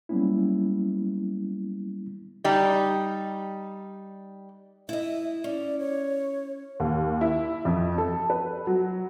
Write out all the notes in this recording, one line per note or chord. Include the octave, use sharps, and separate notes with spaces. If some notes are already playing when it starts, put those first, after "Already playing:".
F#3 G3 A#3 B3 C#4 E4
G3 D#4
E4 D#5 E5
C#4 D5
C#5
D#2
E4
F2
A4
B4
F#3